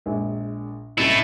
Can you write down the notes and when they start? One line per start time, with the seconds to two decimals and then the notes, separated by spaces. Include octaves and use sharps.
0.06 A#1 G#3
0.98 C2 F#2 A3 E4 D#5